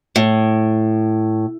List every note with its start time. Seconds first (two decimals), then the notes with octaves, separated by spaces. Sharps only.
0.16 A2